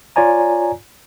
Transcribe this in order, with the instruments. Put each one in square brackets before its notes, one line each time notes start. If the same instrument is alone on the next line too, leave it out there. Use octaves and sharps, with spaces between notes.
[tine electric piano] F4 C#5 D5 G#5 A#5